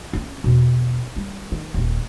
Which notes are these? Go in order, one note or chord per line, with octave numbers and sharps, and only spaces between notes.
C4 C#4
E2 B2
G3
D#3
D#1 D#2